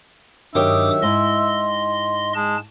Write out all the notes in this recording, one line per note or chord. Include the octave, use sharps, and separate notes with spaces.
G2 D#3 F#3 G4 E5 D6 D#6
G#2 E4 D#5 C6
G#3 A5